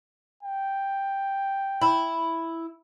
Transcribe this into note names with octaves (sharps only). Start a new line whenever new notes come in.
G5
E4